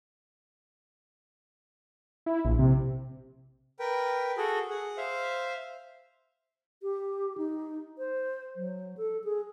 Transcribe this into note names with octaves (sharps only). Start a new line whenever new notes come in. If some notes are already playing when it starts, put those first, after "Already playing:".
E4
A#1
C3
A#4 B4 G5
F#4 G#4 A4
G#4 F#5
C5 E5 F5
G4
D#4
C5
F#3
A4
G#4